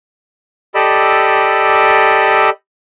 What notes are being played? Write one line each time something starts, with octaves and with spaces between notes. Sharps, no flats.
G4 A4 D5 D#5 B5 E6